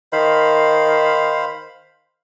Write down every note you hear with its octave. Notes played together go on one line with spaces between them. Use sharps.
D#3 C5 F5 B5